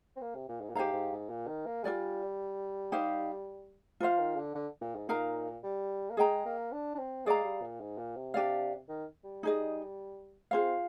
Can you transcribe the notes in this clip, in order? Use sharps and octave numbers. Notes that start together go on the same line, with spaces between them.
C4
A#3
C3
A#2
G#2
A#2
G#2 G4 C5 F5 A#5
G#2
G#2
A#2
D#3
A#3
G3 F4 A#4 D5 G#5
D#4 G4 C5 F5
F3 F4 C5 F5
D#3
D3
D3
A#2
G#2
A#2 D#4 A#4 F5 A#5
G3
A#3
G#3 G#4 D#5 G5 A#5
A#3
D4
D4
C4
G#3 G#4 D5 F5 A#5
G3
A#2
G#2
A#2
C3
D4 G4 D5 F5
D#3
G3
D#4 G#4 D#5
C4 F4 G#4 C5 F5